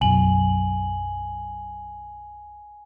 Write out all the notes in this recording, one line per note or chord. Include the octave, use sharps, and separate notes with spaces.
B1 F#2 G#5 F#7